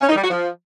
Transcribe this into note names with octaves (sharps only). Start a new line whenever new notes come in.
C#4
D#4
G3
F#4
F3